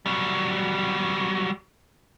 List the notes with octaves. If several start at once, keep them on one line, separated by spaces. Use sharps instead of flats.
F#3 G3